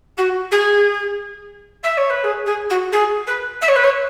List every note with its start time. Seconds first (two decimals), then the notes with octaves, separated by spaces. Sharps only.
0.17 F#4
0.51 G#4
1.83 E5
1.97 C#5
2.09 B4
2.23 G#4
2.46 G#4
2.69 F#4
2.92 G#4
3.26 B4
3.61 E5
3.68 C#5
3.75 B4
3.83 C#5